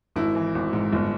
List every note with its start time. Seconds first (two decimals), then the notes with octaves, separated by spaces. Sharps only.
0.16 G#1 E4
0.35 E3
0.55 G#1
0.73 G#2
0.93 G1